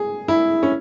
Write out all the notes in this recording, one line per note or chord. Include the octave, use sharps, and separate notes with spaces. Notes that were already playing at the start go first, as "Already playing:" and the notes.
Already playing: G#4
E4
C#4